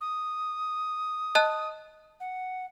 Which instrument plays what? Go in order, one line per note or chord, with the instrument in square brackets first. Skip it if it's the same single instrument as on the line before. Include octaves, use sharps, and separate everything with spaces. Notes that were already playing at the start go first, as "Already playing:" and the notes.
[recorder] D#6
[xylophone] D#5 A5 F#6
[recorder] F#5